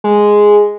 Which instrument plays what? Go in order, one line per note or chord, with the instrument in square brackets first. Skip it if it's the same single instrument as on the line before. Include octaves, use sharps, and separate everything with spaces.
[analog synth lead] G#3